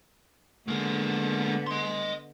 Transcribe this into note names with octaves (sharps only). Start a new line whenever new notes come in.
D3 G#3 A#3 B3
D#5 C6